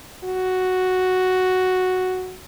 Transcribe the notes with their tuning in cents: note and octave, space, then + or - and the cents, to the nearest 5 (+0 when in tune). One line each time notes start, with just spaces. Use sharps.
F#4 +0